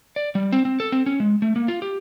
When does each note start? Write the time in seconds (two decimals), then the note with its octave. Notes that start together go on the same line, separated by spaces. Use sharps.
0.16 D5
0.35 G3
0.52 C4
0.65 C4
0.80 A4
0.92 C4
1.06 C#4
1.20 G#3
1.42 A3
1.56 A#3
1.68 F4
1.82 G4